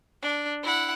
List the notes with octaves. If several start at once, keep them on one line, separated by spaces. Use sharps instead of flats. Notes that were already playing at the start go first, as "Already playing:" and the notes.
D4
E4 F#5